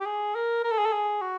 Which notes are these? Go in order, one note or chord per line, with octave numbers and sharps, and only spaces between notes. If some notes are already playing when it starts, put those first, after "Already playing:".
G4
G#4
A#4
A#4
A4
G#4
A4
G#4
F#4